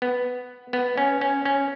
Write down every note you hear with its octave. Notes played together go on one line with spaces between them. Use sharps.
B3
B3
C#4
C#4
C#4